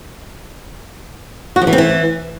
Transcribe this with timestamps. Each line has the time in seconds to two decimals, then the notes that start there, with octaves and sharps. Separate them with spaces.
1.56 F#4
1.62 F3
1.67 E3
1.73 C4
1.78 E3